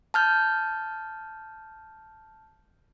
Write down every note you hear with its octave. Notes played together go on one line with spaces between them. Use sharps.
A5 F6 G6